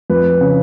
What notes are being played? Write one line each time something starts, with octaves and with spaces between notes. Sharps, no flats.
F2 B4
C#3